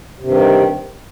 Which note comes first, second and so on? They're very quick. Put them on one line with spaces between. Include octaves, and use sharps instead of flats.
C3 G2 D#3